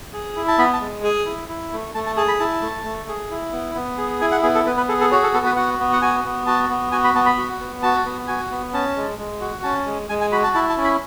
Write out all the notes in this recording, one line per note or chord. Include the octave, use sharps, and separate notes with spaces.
G#4
E4
A5
B3 B5
A5
G#3
G#4 G#5
E4
E4
A3
A3 A5
A5
G#4 A5
B5
E4 A5
A3
A3
G#4
E4
B3
B3
G#4
E4 G#5
F#5
B3 G#4
A4
B3 B4
B4
G#4 A4
A4
F#4 C#5
A4
B3 A4
B4
F#4 F#5
B3
F#5
F#4 G#5
B3
F#4 A5
B3
F#4 G#5
B5
B3 A5
B5
F#4
B3
F#4 A5
B3
F#4 G#5
B3
C#4 A5
G#3
G#3
F#4
C#4 A5
G#3
G#3 G#5
G#5
F#4 B5
A5
E4 A5
A5
C#4
B5